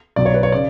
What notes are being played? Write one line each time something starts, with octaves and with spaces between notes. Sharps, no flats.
B1 B2 F#3 D5
C#5
B4
C#5
C#3 D5